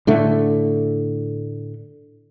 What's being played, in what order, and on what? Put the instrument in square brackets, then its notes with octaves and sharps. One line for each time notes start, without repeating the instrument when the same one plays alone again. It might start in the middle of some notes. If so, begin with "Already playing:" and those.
[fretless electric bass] A2 D3 A3